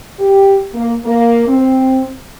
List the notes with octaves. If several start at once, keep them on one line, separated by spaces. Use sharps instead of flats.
G4
A#3
A#3
C4